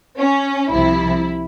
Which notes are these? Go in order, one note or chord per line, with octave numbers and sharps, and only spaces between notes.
C#4
C2 C3 F3 E4